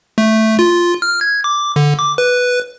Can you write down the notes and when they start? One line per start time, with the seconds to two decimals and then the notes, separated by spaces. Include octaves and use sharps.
0.18 A3
0.59 F4
1.02 F6
1.21 G#6
1.44 D6
1.76 D3
1.99 D6
2.18 B4